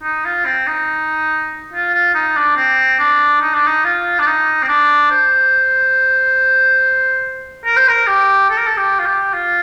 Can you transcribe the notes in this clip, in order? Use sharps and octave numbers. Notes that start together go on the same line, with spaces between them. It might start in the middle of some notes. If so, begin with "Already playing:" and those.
D#4
F4
C4
D#4
F4
F4
D#4
D4
C4
D4
D#4
D4
D#4
F4
D4
D#4
C4
D4
C5
A#4
C5
A#4
G4
A4
A#4
A4
G4
F4
G4
F4